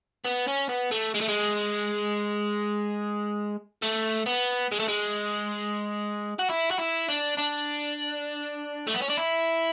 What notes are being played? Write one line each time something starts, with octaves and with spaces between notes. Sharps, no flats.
B3
C#4
B3
A3
G#3
A3
G#3
A3
B3
G#3
A3
G#3
F#4
E4
F#4
E4
D4
D4
A3
B3
C#4
D4
E4